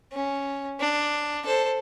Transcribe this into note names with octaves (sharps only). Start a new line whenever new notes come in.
C#4
D4
A4 C5